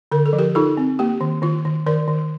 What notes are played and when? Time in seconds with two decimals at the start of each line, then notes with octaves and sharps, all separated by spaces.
0.12 D3 A#4
0.26 A4
0.33 F3
0.39 G4 A#4
0.55 D#4 F4 A4
0.77 C4
0.99 A#3 G4
1.21 D#3
1.42 D#3 F4
1.65 D#3
1.87 D#3 A#4 D5
2.08 D#3